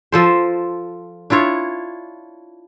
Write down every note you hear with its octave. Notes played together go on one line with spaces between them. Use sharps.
F3 A4 C5
D4 E4 F4 C#5